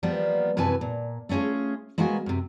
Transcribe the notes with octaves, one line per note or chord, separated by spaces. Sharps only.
F3 G3 A#3 B3 D5
F#2 C3 E3 B4 G#5 A5
A#2
A3 B3 C#4 F4 G#4
G#3 A#3 B3 F#4 E5 G#5
F#2 C3